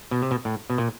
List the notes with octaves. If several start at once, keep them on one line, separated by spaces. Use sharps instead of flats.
B2
C3
B2
A2
B2
A#2